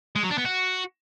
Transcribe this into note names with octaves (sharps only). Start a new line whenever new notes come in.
G#3
F#3
D4
B3
F#4